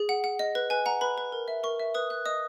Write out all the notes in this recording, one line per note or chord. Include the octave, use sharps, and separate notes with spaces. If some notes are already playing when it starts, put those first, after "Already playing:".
Already playing: G#4
F#5
F#5
D#5
B4
B4 G#5
F#5 A#5
B4 B5
B4
A#4
E5
A#4 C#6
E5
B4 D#6
B4 F#6
D#5 D#6